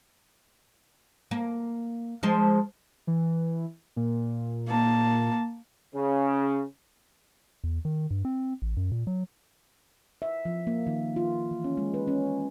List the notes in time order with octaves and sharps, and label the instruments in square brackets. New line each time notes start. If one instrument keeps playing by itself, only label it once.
[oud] A#3
F3 G#3 C5
[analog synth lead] E3
A#2
[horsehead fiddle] A#3 A5
[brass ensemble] C#3
[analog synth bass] E2
D#3
G2
C4
A1
F#2
A#2
F#3
[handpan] E5
F3
A#3
D#3
F4
E3
C#4
G#3
B4
C#4